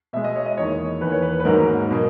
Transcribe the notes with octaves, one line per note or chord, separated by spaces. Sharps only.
B2 G#3 E5
D#5
C#5
D#5
E2 D#3 A#3 C#5
E2 D#3 A#3 B4
C#5
B4
B4
G#2 D#3 F#3 A#3 A#4
B2 A#3